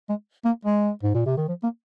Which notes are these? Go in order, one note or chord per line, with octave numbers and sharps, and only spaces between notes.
G#3
A#3
G#3
G#2
A#2
C3
D#3
F3
A#3